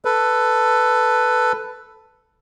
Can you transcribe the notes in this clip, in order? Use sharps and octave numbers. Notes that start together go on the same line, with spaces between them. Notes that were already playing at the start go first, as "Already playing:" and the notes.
A4 B4